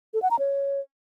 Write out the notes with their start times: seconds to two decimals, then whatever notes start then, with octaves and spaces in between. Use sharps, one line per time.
0.14 A4
0.22 F#5
0.31 A#5
0.39 C#5